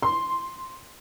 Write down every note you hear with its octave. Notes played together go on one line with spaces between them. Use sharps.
C6